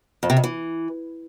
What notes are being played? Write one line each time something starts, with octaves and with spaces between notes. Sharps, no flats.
F2
C3
F2
E3